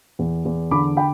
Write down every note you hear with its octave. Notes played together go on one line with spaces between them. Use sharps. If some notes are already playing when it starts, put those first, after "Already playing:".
E2
E2
D3 B5 D6
G5 B5